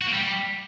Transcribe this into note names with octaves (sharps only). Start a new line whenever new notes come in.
F#4
A#3
G3